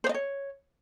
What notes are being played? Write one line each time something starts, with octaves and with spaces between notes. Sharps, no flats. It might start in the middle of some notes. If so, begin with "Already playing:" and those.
C5
D#5
C#5